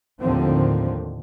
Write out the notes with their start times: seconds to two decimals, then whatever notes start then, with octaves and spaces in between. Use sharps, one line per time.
0.21 D#2 A2 D3 D#3 F3 C4